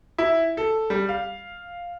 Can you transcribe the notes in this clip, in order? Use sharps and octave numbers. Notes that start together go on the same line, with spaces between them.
E4
A4
G3
F5